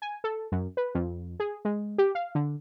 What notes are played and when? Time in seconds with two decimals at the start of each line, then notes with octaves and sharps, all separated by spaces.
0.02 G#5
0.24 A4
0.52 F#2
0.77 B4
0.95 F2
1.40 G#4
1.65 G#3
1.98 G4
2.15 F5
2.35 D3